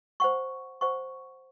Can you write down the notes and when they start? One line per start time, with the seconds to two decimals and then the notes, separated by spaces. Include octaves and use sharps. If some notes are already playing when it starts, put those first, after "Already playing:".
0.20 C5 F#5 C#6
0.81 C5 F#5 C#6